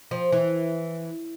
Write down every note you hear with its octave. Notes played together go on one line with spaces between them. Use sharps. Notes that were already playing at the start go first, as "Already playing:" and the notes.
F3
E3